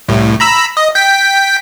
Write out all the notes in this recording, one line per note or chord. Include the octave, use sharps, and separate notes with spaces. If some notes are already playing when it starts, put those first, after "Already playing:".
C2 A2
A#5 B5 E6
D#5
G5 B6